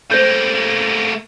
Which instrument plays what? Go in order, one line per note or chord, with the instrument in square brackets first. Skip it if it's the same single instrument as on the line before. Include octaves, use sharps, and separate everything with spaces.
[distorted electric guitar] A3 A#3 [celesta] C5 G6